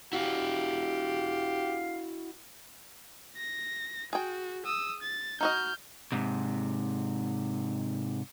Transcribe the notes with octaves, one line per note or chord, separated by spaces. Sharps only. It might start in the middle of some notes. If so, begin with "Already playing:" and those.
E4 F#4 G4 F5
A#6
F#4 G#4 G5
D#6 E6
A6
D#4 F#4 D#5 F6 G6
G#2 C3